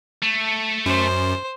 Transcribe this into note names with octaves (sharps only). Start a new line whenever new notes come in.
A3
F#2 C5